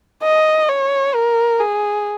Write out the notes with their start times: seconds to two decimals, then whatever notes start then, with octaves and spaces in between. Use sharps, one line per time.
0.23 D#5
0.69 C#5
1.14 A#4
1.60 G#4